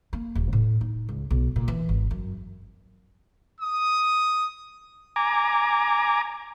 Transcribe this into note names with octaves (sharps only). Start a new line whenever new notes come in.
A#3
D#1
A2
D#4
C#2
B1
A#2
E3
G#1
F#2
D#6
G#5 A#5 D6